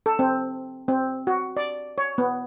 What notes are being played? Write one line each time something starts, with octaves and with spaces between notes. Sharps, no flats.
A4
C4
C4
F#4
D5
C#5
B3